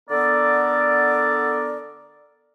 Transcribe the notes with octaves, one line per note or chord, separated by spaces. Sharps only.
D3 B3 A4 A#4 D5